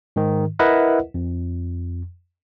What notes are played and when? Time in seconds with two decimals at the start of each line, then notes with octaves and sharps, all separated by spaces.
0.16 G#2 D#3
0.59 E4 A#4 B4 D#5 E5 F#5
1.14 F2